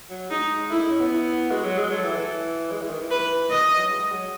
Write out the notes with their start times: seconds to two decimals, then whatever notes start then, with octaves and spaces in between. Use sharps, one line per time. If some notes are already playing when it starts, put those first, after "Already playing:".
0.10 F#3
0.30 G#3 D#4
0.71 A3 E4
0.81 D#4
0.90 C#4
1.00 B3
1.11 E4
1.50 G#3 F#4
1.64 F#3
1.78 G#3
1.91 F#3 A4
2.03 E3
2.18 E3
2.71 G#3
2.81 E3
2.90 D#3
3.01 E3
3.11 B4
3.50 D#3 D#5
3.65 E3
3.77 F#3
3.91 G#3
4.12 F#3